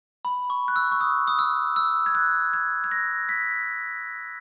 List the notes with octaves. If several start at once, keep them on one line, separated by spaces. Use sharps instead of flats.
B5
C#6
F#6
E6
C#6
D#6
D#6
E6
E6
G#6
F#6
G#6
G#6
A#6
B6